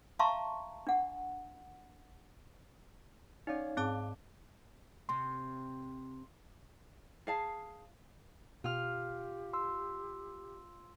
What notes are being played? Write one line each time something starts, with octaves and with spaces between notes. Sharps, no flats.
E5 F5 A5 A#5 C6 C#6
D4 F#5
C#4 D#4 C#5 D5 F5
G#2 C4 A5 D6
C3 C4 C6
G#4 F5 A5
B2 F4 G4 F6
C6 E6